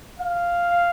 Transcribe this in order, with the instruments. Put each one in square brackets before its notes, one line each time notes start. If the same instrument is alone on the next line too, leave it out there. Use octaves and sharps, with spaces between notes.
[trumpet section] F5